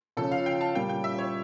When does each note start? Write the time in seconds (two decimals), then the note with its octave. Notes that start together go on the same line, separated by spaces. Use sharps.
0.17 C#3 F3 C#4 A4
0.32 F5
0.46 G5
0.61 A5
0.75 A#2 G3 C#4 G5
0.89 G5
1.04 E5
1.18 C#5